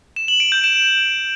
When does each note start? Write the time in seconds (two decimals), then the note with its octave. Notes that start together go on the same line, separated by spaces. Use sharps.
0.16 E7
0.28 F#7
0.40 D7
0.52 G6
0.64 E7